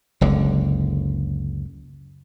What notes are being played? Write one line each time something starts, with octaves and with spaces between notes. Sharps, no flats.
F#1 C#2 D3